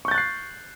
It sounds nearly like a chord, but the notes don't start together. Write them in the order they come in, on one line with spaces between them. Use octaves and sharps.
C#6 G6 A6 F#6 C7